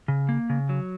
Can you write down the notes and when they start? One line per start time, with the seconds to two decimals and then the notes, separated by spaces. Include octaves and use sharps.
0.08 C#3
0.29 A#3
0.50 C#3
0.69 F#3